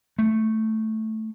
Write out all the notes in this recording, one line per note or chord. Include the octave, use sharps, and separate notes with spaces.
A3